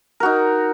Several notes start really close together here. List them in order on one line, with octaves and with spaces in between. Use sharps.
A#4 F#4 D#4